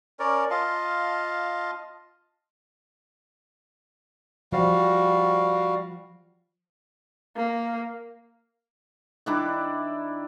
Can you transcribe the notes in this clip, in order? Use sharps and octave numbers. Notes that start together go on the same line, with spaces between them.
C#4 A#4 C#5 D5
F4 D#5 F5 A5
F3 G3 F#4 F5
A#3
D#3 D4 E4 D6